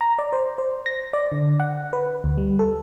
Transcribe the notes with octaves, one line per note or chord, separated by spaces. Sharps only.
A#5
D5
C5
C5
A#6
D5
D3
F#5
B4
D2
G3
A4